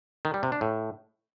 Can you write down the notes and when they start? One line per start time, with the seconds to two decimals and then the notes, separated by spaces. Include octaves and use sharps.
0.25 D#3
0.34 G3
0.43 C3
0.52 D4
0.61 A2